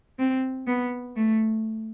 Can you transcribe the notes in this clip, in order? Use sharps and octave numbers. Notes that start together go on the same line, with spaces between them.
C4
B3
A3